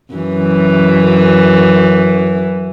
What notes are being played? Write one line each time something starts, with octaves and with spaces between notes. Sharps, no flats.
F#2 E3